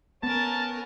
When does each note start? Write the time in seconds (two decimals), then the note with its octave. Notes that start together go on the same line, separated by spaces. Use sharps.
0.23 B3 C#4 A#4 A5 A6